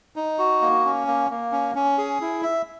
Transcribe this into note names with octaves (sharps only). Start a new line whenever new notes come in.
D#4
F#4
A#3
C#4
A#3
A#3
C#4
C#4
G#4
E4
E5